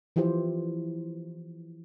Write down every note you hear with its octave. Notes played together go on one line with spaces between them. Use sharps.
E3 F3 E4 G4 C5